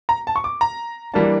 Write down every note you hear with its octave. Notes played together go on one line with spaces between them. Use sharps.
A#5
A5
C#6
D6
A#5
E3 G3 A#3 D4 A5